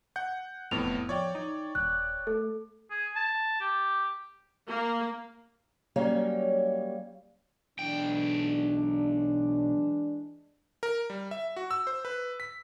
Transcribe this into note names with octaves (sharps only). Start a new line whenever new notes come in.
F#5 G6
E1 F2 A2 B3 F7
F3 C#5 D5 G5
D#4
D#1 F#6
A3 A4
G#4
A5
G4
A#3
F#3 G3 A#3 C#4 C#5
B1 E3 G#3 D4 G5
A#4
G3
E5
F#4
E6
C5
B4
B6